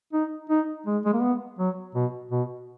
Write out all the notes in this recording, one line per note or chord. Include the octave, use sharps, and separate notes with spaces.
D#4
D#4
G#3
G#3
A#3
B3
F#3
B2
B2